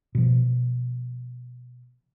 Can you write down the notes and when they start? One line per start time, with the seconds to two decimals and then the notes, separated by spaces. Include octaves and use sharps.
0.15 B2 F3